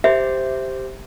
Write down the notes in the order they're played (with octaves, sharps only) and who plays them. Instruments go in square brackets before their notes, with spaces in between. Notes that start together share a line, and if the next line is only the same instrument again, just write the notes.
[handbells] G4 C5 [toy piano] E5